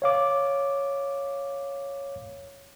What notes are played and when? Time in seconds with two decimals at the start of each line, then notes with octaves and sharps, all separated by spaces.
0.02 C#5 F5 D6